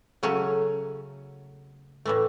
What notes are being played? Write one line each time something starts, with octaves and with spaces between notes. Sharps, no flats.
C#3 F#3 A3 C#4
A2 E3 A3